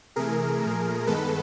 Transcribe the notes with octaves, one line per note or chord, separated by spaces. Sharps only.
C3 E3 A3 G#4 A#4
A#2 F3 A3
G2 D#3 G#3 B3 A4 B4